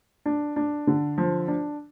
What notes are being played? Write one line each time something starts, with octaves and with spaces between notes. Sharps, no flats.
D4
D4
D3
F3
D4